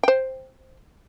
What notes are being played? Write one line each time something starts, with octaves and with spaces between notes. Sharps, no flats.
C5 G5